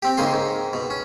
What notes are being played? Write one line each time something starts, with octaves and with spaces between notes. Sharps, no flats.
C4 G4
G#2 C#3 A#3 G#4 C6
G#2
B2
C#4